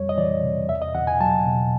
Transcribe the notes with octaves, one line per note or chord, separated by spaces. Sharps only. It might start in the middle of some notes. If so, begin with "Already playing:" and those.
Already playing: F2 G3 C#5
D#5
E3 D5
C3
E2 E5
D#5
E2 F#5
G#5
F#3 A5
B2